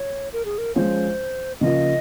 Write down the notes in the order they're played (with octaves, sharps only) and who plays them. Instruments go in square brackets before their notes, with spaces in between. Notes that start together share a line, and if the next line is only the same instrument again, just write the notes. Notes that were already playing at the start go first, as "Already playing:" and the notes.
Already playing: [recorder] C#5
A#4
G#4
A#4
[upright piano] F3 G#3 C#4 F4 [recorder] C5 C#5
[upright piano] C#3 F3 A#3 F4 [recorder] D#5